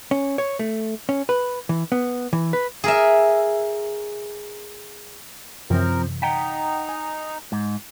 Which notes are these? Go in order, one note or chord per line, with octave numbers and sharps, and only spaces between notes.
C#4
C#5
A3
C#4
B4
E3
B3
E3
B4
G#4 A#4 E5
F#2 C3 E3 F3 C4 A#4
D#4 F#5 G5 A#5 B6
G#5 D#6
G#2